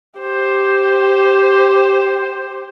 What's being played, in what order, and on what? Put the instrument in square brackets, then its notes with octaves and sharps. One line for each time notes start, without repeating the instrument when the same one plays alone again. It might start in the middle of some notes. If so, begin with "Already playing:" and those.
[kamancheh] G4 C5